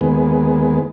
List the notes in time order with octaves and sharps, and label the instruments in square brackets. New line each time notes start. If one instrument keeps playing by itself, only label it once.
[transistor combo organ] D#2 G#3 B3